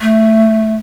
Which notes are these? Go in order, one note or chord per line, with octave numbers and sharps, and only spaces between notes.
A3